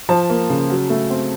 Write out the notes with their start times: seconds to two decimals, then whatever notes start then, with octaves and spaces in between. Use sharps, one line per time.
0.09 F3 A5
0.30 A#3
0.50 C#3
0.69 F#3
0.90 A3
1.10 C4